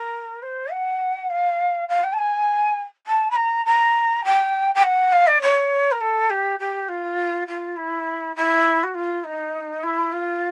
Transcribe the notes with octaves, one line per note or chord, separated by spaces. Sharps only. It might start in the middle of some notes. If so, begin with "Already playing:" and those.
Already playing: A#4
C5
F#5
F5
F5
G5
A5
G#5
A5
B5
A#5
A#5
G5
G5
F#5
F5
D5
C#5
A#4
A4
G4
G4
F4
F4
E4
E4
F#4
F4
D#4
E4
F4